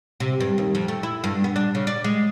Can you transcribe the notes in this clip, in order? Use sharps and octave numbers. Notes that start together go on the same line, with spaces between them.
C3
G2
D#2
F2
A3
E4
G2
B3
D4
C#3
D5
G#3